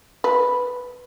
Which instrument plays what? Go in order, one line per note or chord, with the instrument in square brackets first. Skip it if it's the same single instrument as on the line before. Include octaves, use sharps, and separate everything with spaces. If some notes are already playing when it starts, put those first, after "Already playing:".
[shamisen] B4